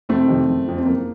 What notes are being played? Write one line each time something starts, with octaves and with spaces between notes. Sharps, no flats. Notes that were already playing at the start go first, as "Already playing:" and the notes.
F1 A3 C4
F2 C3 D#3
F#1
F2 C#3 F3
C4
F#1 A#3